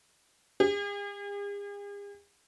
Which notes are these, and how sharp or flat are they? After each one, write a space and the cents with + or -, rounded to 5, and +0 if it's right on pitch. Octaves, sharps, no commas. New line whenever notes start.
G#4 -45